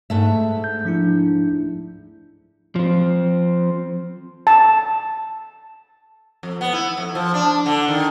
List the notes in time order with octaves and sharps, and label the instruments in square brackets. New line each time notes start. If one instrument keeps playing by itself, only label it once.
[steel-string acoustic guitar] G#2 A3 E5
[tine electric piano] G6
F3 D4 E4
[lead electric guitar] F3 C4
[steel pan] A5
[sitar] F2
B3
E4
F2
F3
D4
D3
D#3